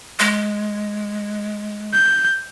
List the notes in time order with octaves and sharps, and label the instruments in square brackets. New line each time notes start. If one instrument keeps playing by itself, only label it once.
[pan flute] G#3
[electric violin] G6